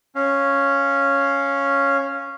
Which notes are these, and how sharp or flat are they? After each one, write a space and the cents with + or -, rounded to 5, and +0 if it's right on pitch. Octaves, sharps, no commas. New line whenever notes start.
C#4 +0 F5 +0